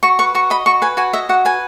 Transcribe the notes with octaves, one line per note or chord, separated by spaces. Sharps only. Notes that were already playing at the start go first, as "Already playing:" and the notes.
F#4 C#6
B4 C#6
F#4 C#6
D#5 B5
F#4 C#6
B4 G#5
F#4 G#5
D#5 E5
F#4 F#5
B4 G#5